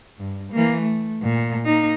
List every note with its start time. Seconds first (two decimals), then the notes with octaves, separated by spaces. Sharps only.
0.19 G2
0.52 E3 A#3
0.82 A3
1.22 A#2
1.65 A#3 D#4